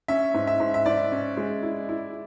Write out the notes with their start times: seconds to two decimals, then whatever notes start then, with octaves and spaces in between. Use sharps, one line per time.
0.08 C#4 E5
0.34 G#2
0.47 E5
0.60 G#2
0.74 E5
0.86 G#2 D5
1.12 C#4
1.37 G#3
1.63 E4
1.89 E4